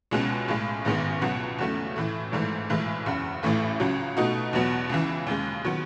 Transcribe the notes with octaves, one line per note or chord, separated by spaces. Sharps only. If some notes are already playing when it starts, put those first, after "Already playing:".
C#2 B2 G#3 C#4
B1 A2 G#3
A1 G#2 D#3 G#3 B3
C#2 B2 F#3 B3 F#4
E2 C#3 F#3 A3 C#4
A2 E3 A3
G#1 G#2 E3 A3
B1 A2 E3 G#3
F#1 E2 C#3
A1 A2 E3 A3 C#4
C#2 C#3 F#3
B2 A3 D#4 F#4
E2 B2 F#3 B3
C#2 C#3 E3
D#2 C#3 G#3
D#3 F#3 B3 F#4